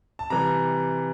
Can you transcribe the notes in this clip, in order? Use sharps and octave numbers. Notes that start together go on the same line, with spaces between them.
A5
C3 E3 G3 A#5